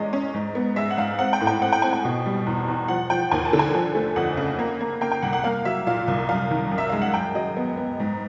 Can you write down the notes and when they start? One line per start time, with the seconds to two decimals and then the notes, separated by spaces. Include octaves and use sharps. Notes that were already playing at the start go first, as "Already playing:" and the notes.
Already playing: E2 G#3 C#4 D5 D#5
0.13 C#4
0.34 G#2
0.55 B3
0.76 G#3 E5
0.91 F#5
0.97 G#2 F5
1.19 C4 F#5
1.33 G5
1.41 A2
1.47 G5
1.62 C4 F#5
1.72 G5
1.82 C4 G#5
1.93 G5
2.05 B2
2.26 G3
2.46 E2
2.68 E2
2.88 F3 F#5
3.10 F3 G5
3.31 D#2 G#5
3.45 A5
3.53 D3
3.59 G#5
3.74 F3
3.95 A3
4.16 F2 F#5
4.37 C#3
4.59 A#3
4.80 A#3
5.01 A#3 G5
5.12 G5
5.22 C2 F#5
5.33 F#5
5.44 A#3 F5
5.65 F#3 E5
5.87 A#2 F5
6.08 C2
6.29 F#2 F5
6.50 D#3
6.71 F#2
6.78 E5
6.89 G#3 F5
7.02 F#5
7.14 F#2 G5
7.35 F#3 D#5
7.57 B3
7.77 B3
8.00 G#2